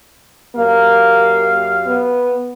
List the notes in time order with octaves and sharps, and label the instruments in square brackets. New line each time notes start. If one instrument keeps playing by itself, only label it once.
[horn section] F#2 G4 F5 [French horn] A#3
[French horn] B3